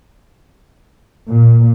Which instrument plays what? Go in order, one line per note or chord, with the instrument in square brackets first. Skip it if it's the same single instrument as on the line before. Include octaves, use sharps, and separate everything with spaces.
[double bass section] A#2